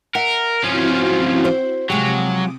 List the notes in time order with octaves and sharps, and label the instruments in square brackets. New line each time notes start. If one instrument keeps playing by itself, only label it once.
[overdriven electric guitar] A#4 [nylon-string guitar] E5 F#5
[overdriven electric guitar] F3 C#4 [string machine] C4 E4 F#4
[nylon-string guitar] C5
[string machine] C3 D6 D#6 [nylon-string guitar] F3 G#3 G4 [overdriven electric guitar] F#3